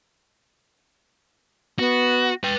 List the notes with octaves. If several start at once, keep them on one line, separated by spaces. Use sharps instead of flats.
B3 F#4
B4 G5